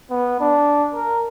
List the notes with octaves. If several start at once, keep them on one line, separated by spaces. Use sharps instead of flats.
B3
D4
A#4